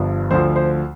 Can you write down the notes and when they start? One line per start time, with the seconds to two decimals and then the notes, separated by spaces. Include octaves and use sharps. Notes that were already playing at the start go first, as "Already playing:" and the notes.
Already playing: G1 G2 F3
0.31 D2 D3 F3 C5
0.56 C5